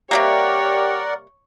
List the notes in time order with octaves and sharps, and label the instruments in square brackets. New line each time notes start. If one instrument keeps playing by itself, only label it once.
[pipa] C3 G3 A#3 [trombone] G4 [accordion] A#4 D5 F#5 [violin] C#5